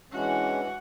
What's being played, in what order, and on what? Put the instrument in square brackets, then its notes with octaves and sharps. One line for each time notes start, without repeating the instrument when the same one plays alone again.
[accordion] E3 [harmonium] G#3 C#4 D4 [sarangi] F#4